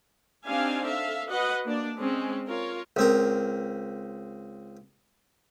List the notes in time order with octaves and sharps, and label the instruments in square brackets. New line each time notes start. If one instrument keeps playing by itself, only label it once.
[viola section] C4 D4 D#4 G4 F5 G#5
A4 E5 F5
F#4 B4 D#5 F#5
A#3 D4 D5
G#3 C4 C#4
F4 A#4 C#5
[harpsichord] C#2 C4 A#4